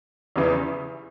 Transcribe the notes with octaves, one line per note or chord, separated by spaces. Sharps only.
E2 C#3 E3